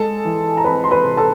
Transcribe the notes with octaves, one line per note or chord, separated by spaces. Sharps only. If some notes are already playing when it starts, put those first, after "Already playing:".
Already playing: G#3 A4 A5
E3
A#5
C4 B4 B5
C6
B4 B5
C3
A4 A5